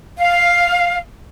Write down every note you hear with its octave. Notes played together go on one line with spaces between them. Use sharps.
F5